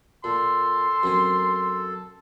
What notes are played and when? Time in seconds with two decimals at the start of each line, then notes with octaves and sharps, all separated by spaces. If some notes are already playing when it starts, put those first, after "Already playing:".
0.24 A#2 A4 C6
1.03 F#2 C4 G#5